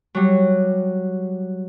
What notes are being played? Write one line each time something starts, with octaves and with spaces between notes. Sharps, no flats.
F#3 G3